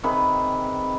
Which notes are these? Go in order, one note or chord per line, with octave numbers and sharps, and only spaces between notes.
C3 D#3 G#4 B4